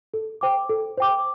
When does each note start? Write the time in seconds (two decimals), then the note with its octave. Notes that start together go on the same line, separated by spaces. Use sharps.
0.14 A4
0.41 C5 G5 D6
0.69 A4
0.98 C5 G5 D6